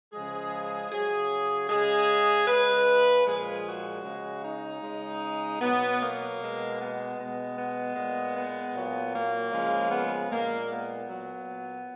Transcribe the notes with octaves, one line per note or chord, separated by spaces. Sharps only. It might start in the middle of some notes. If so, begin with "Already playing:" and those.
C#3 F3 G#3 G#4
C#3 F#3 G#4
C#3 G#3 G#4
C#3 G#3 B4
A#2 F3 G#3 G#4
F#4
C#3 G#3
D#4
C#3 G#3
B2 F#3 B3
A#3
B2 G#3
B3
B2 G#3
B3
A#2 G#3
B3
A#2 F#3
A#3
C#3 F3 G#3
B3
A#2 G#3 A#3
B3
A#2 F#3